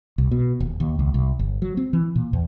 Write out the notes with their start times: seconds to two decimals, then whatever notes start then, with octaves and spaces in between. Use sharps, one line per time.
0.18 C2
0.31 B2
0.60 D#1
0.80 D#2
0.99 C#2
1.14 C2
1.39 G1
1.62 F#3
1.77 C4
1.93 E3
2.16 A#2
2.33 E2